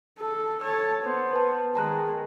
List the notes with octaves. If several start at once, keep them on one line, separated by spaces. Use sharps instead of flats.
A4
A4 C#5 A5 E6
B3 C5
B4 A5
D#3 G#3 A5 A#5 F#6